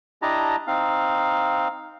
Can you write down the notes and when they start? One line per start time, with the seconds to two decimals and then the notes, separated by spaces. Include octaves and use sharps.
0.22 D4 E4 G4 D#5 A5 A#5
0.67 C4 D#4 F5